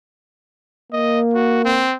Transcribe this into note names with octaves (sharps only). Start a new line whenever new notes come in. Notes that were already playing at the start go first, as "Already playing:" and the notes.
A#3 D#5
F#4
C4